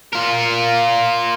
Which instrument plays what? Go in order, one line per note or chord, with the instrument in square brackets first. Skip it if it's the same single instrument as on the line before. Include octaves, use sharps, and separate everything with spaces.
[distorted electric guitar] F4 A#4